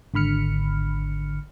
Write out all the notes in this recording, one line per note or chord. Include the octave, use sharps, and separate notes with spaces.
G#1 D3 B5 F6 C#7